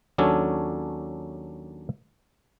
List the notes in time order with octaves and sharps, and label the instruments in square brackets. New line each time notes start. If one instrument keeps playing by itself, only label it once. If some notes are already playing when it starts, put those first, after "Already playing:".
[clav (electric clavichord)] D#2 F#3 C#4 D4 A4 G#5